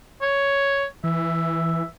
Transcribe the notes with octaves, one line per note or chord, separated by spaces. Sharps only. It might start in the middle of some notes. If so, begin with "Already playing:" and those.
C#5
E3 E5